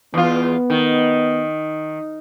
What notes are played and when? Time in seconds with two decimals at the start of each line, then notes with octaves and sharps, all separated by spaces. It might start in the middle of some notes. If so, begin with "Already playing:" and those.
0.14 E2 B3 F4
0.70 D#3